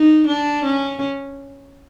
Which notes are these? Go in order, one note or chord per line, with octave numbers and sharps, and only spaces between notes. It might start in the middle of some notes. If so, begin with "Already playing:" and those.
Already playing: D#4
D4
C#4